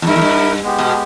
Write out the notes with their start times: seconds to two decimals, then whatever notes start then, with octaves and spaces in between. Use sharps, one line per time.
0.02 E2
0.07 G2 E4 A#4 E5
0.16 E2
0.22 G2
0.63 G#3 B3 G4
0.79 B2